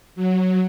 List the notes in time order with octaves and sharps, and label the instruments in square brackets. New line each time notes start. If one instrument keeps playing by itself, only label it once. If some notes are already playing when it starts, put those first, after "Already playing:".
[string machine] F#3